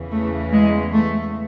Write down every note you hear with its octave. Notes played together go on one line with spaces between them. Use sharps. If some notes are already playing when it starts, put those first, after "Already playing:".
Already playing: E2 C#3 E3
A3
G#3
A3